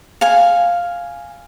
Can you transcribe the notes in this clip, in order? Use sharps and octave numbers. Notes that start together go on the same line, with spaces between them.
F5 G#5